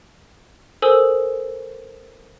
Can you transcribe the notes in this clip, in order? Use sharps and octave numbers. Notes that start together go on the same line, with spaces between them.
A4 A#4 C5 G#5 D#6 E6